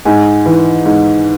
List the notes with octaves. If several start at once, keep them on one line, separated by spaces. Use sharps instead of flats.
G#2 G#5
E3
G#2